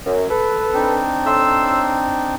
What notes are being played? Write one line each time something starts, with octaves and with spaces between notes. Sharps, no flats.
F#2
A4 B4
C4 D4 D#4
A2 C6 E6